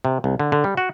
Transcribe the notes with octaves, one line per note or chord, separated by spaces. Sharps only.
C3
C2
D3
D3
G3
F#4